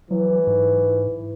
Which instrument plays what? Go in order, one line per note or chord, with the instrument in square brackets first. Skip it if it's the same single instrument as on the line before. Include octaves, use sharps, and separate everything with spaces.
[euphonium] E3 [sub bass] F#3
[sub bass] G#2